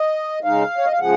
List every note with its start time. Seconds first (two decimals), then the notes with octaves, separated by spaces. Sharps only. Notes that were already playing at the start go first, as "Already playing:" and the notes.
Already playing: D#5
0.44 C#3 G#3 D#4 F5
0.78 C#5
0.85 D#5
0.92 F5
0.99 C#3 F3 G#3 F#5